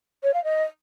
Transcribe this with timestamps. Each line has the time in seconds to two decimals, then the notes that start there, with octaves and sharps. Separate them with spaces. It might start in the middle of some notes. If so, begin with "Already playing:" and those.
0.23 C#5
0.34 F5
0.44 D#5